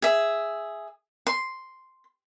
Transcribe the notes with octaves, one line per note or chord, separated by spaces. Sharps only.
G#4 E5
C6